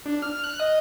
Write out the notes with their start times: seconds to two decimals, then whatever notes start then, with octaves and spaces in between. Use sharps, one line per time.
0.06 D4
0.22 F6
0.44 F#6
0.60 D#5